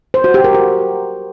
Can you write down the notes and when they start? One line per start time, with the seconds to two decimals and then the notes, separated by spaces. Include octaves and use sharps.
0.14 C5
0.24 F#4
0.34 G4
0.44 A#4
0.54 F#4